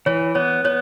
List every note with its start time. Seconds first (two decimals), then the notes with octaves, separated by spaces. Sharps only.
0.06 E3 C#5
0.35 B3 C#5
0.64 B3 C#5